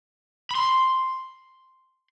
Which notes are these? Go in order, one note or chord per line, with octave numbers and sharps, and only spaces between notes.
B5 C6